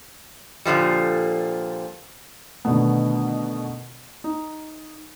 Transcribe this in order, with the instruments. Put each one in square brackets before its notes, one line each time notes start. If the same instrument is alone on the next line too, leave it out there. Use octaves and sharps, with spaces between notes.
[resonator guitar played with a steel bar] A#2 D3 F3 G3
[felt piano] B2 D3 D#3 A3 B3
D#4